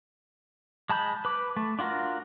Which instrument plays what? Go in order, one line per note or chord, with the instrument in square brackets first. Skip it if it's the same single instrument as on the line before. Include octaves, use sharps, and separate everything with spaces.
[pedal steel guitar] G#3 A5 B5 G6
B4 D6
A3
D4 F4 F#4 A#4